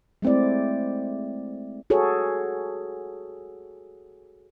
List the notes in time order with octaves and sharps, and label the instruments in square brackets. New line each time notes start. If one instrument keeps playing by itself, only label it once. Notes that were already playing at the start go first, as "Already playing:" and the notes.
[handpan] G#3 A3 C4 E4 D5
F#4 G#4 A4 C#5